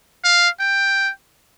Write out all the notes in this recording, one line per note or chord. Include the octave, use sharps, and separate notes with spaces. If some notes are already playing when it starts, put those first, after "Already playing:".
F5
G5